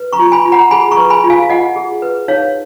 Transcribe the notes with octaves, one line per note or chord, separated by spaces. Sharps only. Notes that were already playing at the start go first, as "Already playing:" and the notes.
Already playing: B4
A#5 C#6
F4
G#5 B5
F4
F#5 A#5
G#4 G#5 B5
A#5 C#6
B4
G#5 B5
F4
F5 G#5
F5
F4 D#5 F#5
G#4
B4
D#4 C#5 F5